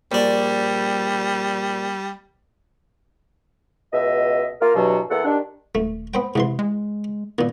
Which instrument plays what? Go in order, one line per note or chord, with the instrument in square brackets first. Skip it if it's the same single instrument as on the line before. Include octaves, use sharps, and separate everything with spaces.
[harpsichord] A#1 D4 [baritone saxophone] G3
[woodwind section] C#2 B2 D#5 E5
A#3 F4 A#4
E2 G2 B2 F#3
E2 A#3 A4 F#5
D#3 G3 D4
[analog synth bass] D#1 [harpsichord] A3
[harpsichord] B3 C5 G5
[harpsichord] G#2 E3 C6 [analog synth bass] C3
[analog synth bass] G#3
[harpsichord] A#2 D#3 [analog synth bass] B3